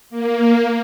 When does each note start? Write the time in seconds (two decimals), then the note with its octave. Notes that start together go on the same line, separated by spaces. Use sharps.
0.10 A#3